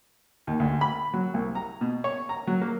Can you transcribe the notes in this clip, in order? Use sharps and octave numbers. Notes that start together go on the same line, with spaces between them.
D#2
D2
B5
F#3
C2
A#5
B2
C#5
A#5
F#3
A#3